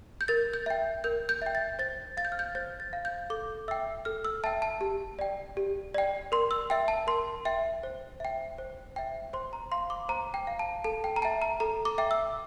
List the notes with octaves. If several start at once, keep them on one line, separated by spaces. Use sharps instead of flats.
G6
A#4 A6
G6
E5 G5
A#4 G6
G6
E5 G5
A6
C5 A6
F5 A6
G6
F6
G6
C5 A6
A6
F5
G6
A4 D6
E5 G5 E6
A4 F6
E6
E5 G5 A5
A5
G4
D5 G5
G4
D5 G5
A#4 C6
E6
E5 G5
A5
A#4 C6
E5 G5
C5
E5 G5
C5
E5 G5
C5 C6
A#5
F5 C6
D6
C5 A#5
G5
F5
A5
A4 A5
G5
A#5
E5 G5 A5
A#5
A4 A#5
D6
E5 G5
E6